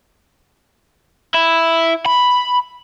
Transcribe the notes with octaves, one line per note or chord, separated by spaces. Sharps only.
E4
B5